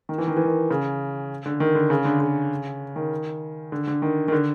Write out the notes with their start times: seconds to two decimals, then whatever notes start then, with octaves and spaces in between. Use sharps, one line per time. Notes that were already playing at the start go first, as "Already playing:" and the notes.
0.09 D#3
0.18 E3
0.27 D#3
0.37 E3
0.45 D#3
0.70 C#3
1.46 D3
1.60 D#3
1.75 D3
1.90 C#3
2.05 D3
2.20 C#3
2.96 D#3
3.72 D3
3.87 D3
4.02 D#3
4.28 D#3
4.32 D3